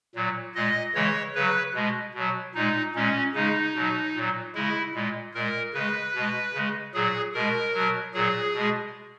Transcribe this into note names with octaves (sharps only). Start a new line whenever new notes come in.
A#2 F#3
A#2 G#3 D#5
C#3 E3 G#3 C#5
C#3 F#3 B4
B2 G#3
B2 F#3
A#2 G#3 D#4
A#2 G#3 C#4
C#3 G#3 D#4
B2 F#3
A#2 F#3
C#3 G#3 E4
A#2 G#3
A#2 G#3 A#4
C#3 G#3 B4
B2 G#3
C#3 G#3
A#2 F#3 G#4
B2 G#3 A#4
B2 F#3
A#2 F#3 G#4
B2 G#3